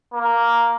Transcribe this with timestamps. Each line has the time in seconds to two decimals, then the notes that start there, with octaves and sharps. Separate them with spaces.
0.14 A#3